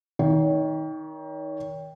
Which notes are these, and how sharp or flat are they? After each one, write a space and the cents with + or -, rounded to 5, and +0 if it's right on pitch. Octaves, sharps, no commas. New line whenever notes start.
D#3 +20 C#5 +40